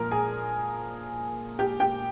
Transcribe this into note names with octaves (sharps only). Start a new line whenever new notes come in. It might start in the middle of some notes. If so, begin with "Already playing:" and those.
Already playing: A#2 F3 A#4 A#5
G#4 G#5
G4 G5
G4 G5